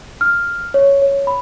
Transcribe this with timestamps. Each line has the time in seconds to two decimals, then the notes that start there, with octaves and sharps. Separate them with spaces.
0.21 F6
0.74 C#5
1.02 C#5
1.27 B5